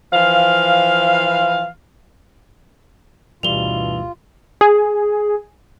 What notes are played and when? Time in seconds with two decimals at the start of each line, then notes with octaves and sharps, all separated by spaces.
0.13 E3 F3 F5
3.43 D2 G2 B2 E3 G3 F4 F7 G7
4.61 G#4